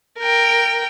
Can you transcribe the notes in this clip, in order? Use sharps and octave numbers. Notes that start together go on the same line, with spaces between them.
A#4 G5